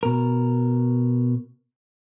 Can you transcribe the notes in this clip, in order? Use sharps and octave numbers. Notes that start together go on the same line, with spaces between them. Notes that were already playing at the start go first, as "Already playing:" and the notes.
B2 A#4